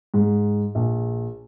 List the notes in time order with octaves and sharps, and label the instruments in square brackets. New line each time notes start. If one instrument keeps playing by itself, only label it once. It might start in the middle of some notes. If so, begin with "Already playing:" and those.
[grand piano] G#2
A#1